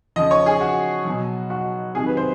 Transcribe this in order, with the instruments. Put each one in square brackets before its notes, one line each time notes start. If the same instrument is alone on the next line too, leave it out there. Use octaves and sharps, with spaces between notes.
[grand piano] C#3 F3 D#5
C#5
G#4
F#4
B2 F#3
F#4
C3 D#3 F#3 G#4
B4
C5